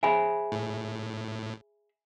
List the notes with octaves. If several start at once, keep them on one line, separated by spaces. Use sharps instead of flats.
G#4 C5 E5 G#5 B5
A2